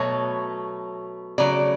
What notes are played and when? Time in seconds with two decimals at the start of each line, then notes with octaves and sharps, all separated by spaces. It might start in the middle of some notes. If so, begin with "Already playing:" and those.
Already playing: B2 F#3 A3 C#5
1.38 C#3 F#3 A3 D5